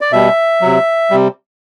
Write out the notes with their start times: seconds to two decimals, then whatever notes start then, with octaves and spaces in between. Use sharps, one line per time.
0.01 D5
0.12 B2 G3 E5
0.61 C3 F#3
1.11 C3 G3